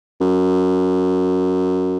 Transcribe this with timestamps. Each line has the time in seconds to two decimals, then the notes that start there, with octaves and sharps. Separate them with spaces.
0.21 F#2